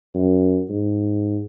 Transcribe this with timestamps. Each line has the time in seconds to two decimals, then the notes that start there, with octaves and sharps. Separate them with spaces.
0.15 F#2
0.70 G#2